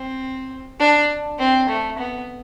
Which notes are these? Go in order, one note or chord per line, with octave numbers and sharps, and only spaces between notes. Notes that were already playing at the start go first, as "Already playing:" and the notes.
Already playing: C4
D4
C4
A3
B3